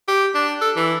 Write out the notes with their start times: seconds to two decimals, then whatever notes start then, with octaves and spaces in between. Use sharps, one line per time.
0.08 G4
0.35 D4
0.61 A4
0.76 E3